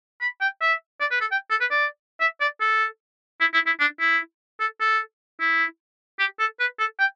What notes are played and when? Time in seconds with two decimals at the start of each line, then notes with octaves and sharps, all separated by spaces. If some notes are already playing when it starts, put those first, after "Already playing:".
0.21 B5
0.41 G5
0.61 E5
1.00 D5
1.11 B4
1.21 A4
1.31 G5
1.50 A4
1.61 B4
1.71 D5
2.20 E5
2.41 D5
2.60 A4
3.40 E4
3.54 E4
3.66 E4
3.80 D4
4.00 E4
4.60 A4
4.80 A4
5.40 E4
6.19 G4
6.39 A4
6.60 B4
6.79 A4
6.99 G5